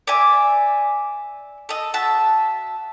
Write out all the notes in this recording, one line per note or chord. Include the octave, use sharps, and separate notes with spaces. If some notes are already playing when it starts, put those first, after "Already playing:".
D5 E5 G#5
A4 D#5
F#4 E5 A5